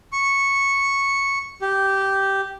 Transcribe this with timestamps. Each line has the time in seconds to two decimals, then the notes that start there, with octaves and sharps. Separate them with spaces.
0.12 C#6
1.62 G4